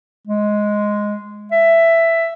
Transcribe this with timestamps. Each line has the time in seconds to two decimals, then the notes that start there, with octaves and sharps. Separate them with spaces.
0.27 G#3
1.52 E5